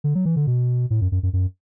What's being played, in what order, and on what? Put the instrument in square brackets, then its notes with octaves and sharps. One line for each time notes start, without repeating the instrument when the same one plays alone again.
[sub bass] D3
F#3
E3
D3
B2
A2
F#2
F#2
F#2
F#2